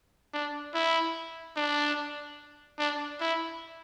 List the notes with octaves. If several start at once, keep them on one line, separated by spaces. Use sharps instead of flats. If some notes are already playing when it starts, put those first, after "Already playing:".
D4
E4
D4
D4
E4